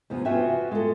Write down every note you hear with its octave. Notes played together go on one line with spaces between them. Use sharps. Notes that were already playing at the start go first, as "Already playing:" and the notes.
E2 C3 F3 B3
B3 F4 F#4 E5 G5 G#5
G#3 A4